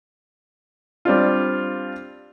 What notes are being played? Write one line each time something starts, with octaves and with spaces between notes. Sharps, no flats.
G3 C4 D4 F4